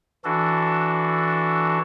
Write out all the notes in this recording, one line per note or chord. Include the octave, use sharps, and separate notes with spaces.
E3 D4 F#4 A4